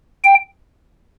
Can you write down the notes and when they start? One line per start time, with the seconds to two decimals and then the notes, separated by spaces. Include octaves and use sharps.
0.25 G5